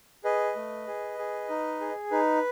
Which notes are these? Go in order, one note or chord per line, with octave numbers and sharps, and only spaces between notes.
G#4 B4 D#5
A3
G#4
G#4
D#4
G#4
D#4 B4